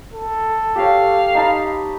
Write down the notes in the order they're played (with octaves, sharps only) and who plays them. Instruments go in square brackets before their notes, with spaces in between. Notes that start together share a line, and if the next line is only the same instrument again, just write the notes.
[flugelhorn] A4
[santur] G4 C#5 [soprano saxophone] F5
[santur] D#4 A5 B5